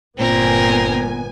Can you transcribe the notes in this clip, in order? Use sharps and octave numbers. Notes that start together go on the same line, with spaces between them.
G1 A#2 B3 C4 A#4 G#5